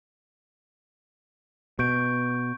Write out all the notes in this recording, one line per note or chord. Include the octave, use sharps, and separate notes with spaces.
B2 C#6 G6 D7